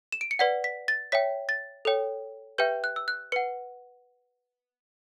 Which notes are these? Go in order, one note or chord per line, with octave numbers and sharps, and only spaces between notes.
E7
D7
C#7
B4 D5 F#5 B6
B6
A6
C#5 E5 G5 B6
A6
A4 C#5 G5
G4 B4 E5 G5 G6
F#6
E6
F#6
B4 F#5 C#7